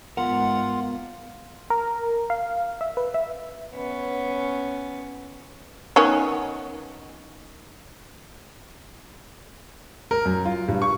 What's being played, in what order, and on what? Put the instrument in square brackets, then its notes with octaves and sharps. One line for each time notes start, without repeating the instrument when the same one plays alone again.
[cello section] G#2 [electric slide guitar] B3 A#4 [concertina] F4 [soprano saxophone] F#5
[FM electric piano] A#4
F5
E5
B4
E5
[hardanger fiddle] B3 C#4
[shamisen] D#3 B3 C#4
[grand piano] A#4
F#2
F4
G2
C#6